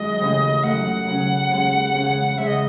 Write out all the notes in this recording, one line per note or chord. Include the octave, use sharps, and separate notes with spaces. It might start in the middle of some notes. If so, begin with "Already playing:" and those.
Already playing: F#2 D#3 G#3 E4 D#5
D#2 C#3 E3 A3 C#4
F#2 D#3 A3 F#5
C#3 F#3 C#4 G#4
D#2 C#3 G#3 C#4
E2 C#3 G#3 C#4 G#4
C#3 G#3 C#4 G#4 E5
D#5